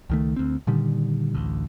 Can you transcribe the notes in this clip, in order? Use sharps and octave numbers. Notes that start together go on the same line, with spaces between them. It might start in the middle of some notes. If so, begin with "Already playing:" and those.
C#2 D#3 A3
D2 C4
A#2 D3 D#3 G3
A1 D2